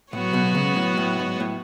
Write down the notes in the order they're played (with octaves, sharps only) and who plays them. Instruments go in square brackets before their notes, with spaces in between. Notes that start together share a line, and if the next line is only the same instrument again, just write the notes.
[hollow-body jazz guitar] A2 [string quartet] F#3 B3 F#4 C#5
[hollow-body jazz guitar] B1 B2
C#2 C#3
A2
A2
G#2
A2